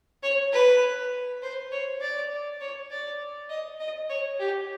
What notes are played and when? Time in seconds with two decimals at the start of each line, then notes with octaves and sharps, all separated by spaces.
0.23 C#5
0.53 B4
1.42 C5
1.72 C#5
2.01 D5
2.60 C#5
2.91 D5
3.50 D#5
3.80 D#5
4.10 C#5
4.40 G4